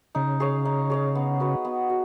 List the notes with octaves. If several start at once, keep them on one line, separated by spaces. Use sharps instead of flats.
C#3 D#4
G#4 C#5 F5
D#4
G#4 C#5 F5
B3
F#4 B4
B3
F#4